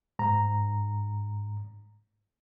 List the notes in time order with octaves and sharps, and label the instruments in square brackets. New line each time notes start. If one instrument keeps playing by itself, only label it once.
[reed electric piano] G#2 A#5